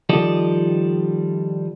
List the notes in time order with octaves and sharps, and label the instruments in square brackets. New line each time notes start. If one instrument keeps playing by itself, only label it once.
[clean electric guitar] D#3 F3 G3 A4 D5 D#5